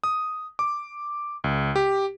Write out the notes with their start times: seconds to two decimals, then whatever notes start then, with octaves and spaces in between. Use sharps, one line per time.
0.04 D#6
0.59 D6
1.44 C#2
1.76 G4